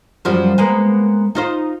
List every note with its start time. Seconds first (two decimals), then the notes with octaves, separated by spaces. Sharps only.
0.25 F#2 F3 G3
0.58 G#3 A#3 B3
1.35 D#4 F4 C5